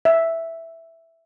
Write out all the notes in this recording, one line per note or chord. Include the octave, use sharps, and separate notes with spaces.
E5